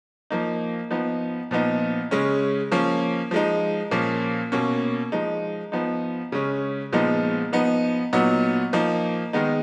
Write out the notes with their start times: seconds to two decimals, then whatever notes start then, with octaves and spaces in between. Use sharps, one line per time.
0.31 F3 A#3 D#4
0.91 F3 B3 D#4
1.51 A#2 F3 B3 D#4
2.11 C#3 G#3 C#4
2.72 F3 A#3 C#4
3.31 F3 G#3 D#4
3.91 A#2 F3 A#3 C#4
4.52 B2 A#3 C#4
5.12 F3 G#3 D#4
5.72 F3 B3 D#4
6.32 C#3 G#3 C#4
6.93 A#2 F3 G#3 B3 D#4
7.52 F3 B3 D#4
8.13 A#2 F#3 B3 D#4
8.73 F3 A#3 D#4
9.33 D#3 G#3 B3 D#4